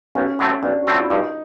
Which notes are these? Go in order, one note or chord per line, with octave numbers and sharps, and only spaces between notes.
B1 C#4
A2 F#3 A3 C4
B1 D4
F#4
A2 F#3 A3 C4 F4
E4
G2 D#4